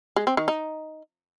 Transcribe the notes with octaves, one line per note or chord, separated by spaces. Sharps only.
G#3
C4
D#3
D#4